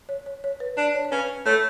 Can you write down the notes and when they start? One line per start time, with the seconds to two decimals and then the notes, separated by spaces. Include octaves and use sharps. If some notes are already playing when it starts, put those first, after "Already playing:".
0.09 C#5
0.26 C#5
0.44 C#5
0.60 B4
0.77 D4 D5
0.95 C#5
1.05 C#5
1.11 C#4 B4
1.45 A3 C#5